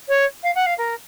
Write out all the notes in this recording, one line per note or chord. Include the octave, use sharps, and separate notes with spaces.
C#5
F5
F#5
F5
A#4